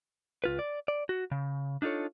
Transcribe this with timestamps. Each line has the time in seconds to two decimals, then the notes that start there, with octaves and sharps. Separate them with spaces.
0.44 C#2 F4 B4
0.59 D5
0.88 D5
1.09 F#4
1.31 C#3
1.82 D4 D#4 F4 A4 C#5